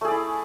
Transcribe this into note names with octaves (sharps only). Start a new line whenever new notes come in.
A3 E4 G#4 D5